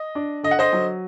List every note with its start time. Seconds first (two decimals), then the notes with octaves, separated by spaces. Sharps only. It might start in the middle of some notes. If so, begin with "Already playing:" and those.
Already playing: D#5
0.15 D4
0.43 D3 D#5
0.51 F#5
0.59 C5 D#5
0.73 F#3